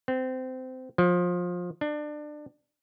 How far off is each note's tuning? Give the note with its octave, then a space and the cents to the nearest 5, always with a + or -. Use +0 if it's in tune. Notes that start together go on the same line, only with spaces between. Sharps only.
C4 -20
F3 +25
D4 +25